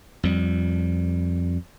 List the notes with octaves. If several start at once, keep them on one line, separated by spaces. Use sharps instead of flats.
F2 G3